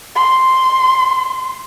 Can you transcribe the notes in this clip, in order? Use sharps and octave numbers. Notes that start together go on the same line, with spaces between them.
C6